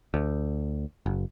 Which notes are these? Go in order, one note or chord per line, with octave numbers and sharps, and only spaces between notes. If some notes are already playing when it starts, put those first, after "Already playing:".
D2
F#1